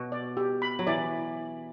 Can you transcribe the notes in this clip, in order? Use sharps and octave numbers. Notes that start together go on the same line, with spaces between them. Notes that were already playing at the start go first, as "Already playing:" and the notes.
Already playing: B2 F#4
D5
G4
B5
F#3
E3 D5